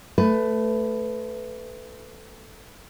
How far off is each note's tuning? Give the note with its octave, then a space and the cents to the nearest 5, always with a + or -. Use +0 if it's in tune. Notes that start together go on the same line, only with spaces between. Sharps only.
A3 +0 B4 +15